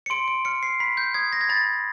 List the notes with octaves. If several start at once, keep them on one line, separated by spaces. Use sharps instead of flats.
C#7
C6 D7
D7
F6 C#7
C7
B5 B6
G6
D#6 G#6
A#6
G#6
B5 A6